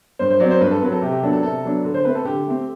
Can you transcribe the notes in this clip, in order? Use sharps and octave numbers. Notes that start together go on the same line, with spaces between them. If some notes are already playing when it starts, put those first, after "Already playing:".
G2 C5
C5
F#3 D5
C4
C5
G2 B4
A4
F#3 C4 B4
A4
C3 G4
G4
F#3 B3 D4 A4
A4
C3 A4
F#3 B3 D4
D3
C5
A3 C4 B4
A4
D3 G4
A3 C4